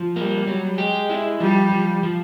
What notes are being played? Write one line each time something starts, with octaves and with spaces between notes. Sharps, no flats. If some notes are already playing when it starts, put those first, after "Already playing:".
Already playing: F3
G3 A#3
F#3
G#3 G4
E4
F3 G3
F3
F3